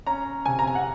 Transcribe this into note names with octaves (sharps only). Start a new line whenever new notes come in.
C#4 A#5
C3 G#5
A#5
G#5
F#5